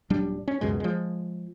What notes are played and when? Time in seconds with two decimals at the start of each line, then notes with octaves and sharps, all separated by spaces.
0.10 D#1 F#3 G3 D4
0.48 C#4
0.61 C#2 F#2 B2 G#3
0.80 F3 G#3